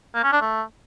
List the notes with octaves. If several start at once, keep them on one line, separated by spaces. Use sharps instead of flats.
A#3
C#4
D4
A3